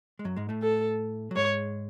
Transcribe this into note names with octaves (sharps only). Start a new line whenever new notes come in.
G#3
F#2 F#3
G#2 G#3
A2 A3
A4
F#3
G#2 G#3 C#5